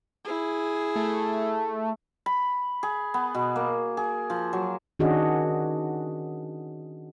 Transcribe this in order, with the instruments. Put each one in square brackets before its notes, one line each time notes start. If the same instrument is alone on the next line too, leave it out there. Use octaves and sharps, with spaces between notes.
[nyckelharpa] E4 G#4
[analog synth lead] A3
[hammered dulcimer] B5
G#4
B3
B2
A#3
G#4
F3
F#3
[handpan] D#3 C#4 D4 F#4 G#4 D#5